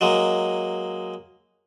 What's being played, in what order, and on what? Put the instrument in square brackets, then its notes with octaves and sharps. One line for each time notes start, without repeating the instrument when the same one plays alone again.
[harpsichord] F#3 G#3 A#3